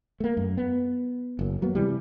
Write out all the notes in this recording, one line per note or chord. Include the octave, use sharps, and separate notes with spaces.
A3 A#3
F#2
B3
F#1 F#2
F#3 A#3 B3
C3 E3 G3